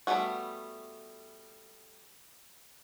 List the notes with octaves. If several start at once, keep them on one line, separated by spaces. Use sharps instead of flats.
G3 A3 B3 C#4 F#4